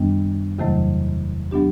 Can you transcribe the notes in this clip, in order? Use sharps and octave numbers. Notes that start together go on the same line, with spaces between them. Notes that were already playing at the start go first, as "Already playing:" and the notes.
Already playing: F#2 D#3 G3 B3 D4
E2 C3 D#3 F#3 A3
F#3 B3 D4 G4